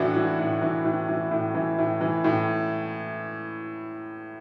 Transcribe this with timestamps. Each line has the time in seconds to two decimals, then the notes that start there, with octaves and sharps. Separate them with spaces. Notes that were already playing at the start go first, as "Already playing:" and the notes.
Already playing: A2 E3 D4 F#4
0.16 E3
0.39 A2
0.62 E3
0.85 A2
1.08 E3
1.31 A2
1.55 E3
1.78 A2
2.01 E3
2.24 A2